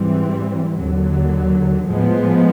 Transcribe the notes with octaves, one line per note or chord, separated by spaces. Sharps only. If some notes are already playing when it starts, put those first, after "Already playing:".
Already playing: G#2 E3 G3 C4
D#2 D3 F#3
A2 F3 G#3 B3